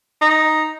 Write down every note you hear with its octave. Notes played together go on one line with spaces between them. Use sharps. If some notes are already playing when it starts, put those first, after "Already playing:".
D#4